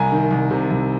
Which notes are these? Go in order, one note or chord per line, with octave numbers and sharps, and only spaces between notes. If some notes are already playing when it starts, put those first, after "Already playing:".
Already playing: C2 G#5 A#5
D#3
C2
C3
C2